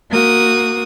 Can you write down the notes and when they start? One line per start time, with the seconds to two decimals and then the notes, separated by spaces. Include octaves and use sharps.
0.10 A#3 F#4 D#6